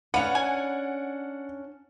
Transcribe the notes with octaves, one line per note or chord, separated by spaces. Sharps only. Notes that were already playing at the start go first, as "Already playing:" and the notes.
C#4 D4 B4 F5 F#5
G#5